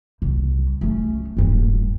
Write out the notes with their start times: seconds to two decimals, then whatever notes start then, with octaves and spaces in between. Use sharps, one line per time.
0.22 C2
0.81 A3 C#4
1.37 D#1 G2